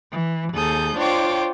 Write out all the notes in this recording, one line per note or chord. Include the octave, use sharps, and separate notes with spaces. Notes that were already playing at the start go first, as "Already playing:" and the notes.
E3
D#2 G#4 A4 D#6 G6
D4 F4 C5 C#5 G5 D6